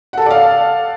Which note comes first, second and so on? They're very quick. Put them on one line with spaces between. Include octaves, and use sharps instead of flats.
F#5 A4 A5 D5 F5